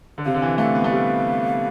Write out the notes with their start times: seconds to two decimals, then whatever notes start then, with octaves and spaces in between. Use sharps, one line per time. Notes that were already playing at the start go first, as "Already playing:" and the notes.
0.18 D3
0.25 C3 F5
0.34 D3
0.42 E3
0.58 A3 F5
0.75 B3
0.84 A3
0.91 G3